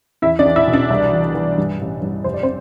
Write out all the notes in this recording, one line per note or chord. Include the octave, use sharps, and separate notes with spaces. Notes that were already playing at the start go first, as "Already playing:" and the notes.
E2 E4 E5
D4 D5
E2
E4 E5
B2
D4 D5
C2
E3
E3
G2
A1
G2
F1 C5
D5
C4 C5